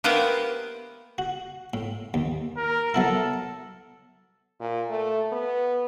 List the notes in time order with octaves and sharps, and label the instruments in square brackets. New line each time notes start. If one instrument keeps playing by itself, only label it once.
[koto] A#3 B3 G4 B4 C5 E5
[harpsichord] F#4
A2
D#2
[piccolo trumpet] A#4
[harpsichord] F#3 B3 E4 [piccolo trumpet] A4
[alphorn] A#2
A3
B3